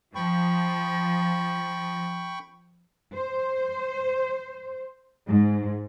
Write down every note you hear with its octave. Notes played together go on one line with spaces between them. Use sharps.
F3 G5 B5 C#6
C5
G#2